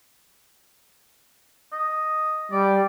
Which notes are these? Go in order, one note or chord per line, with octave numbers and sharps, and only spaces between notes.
D#5
G3 D5